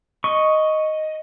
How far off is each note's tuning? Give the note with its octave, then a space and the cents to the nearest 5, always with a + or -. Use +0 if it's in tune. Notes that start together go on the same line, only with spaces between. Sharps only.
D#5 +0 C#6 +0